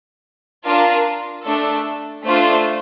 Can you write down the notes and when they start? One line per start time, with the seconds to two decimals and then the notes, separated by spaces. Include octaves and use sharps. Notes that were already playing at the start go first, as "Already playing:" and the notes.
0.64 D4 F4 A#4 F5 A5
1.45 A3 D4 A4
2.26 A3 D4 F4 C5